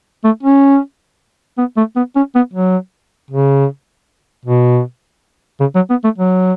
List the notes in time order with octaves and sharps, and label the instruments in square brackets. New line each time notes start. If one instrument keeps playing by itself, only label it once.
[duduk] A3
C#4
B3
A3
B3
C#4
B3
F#3
C#3
B2
C#3
F#3
B3
A3
F#3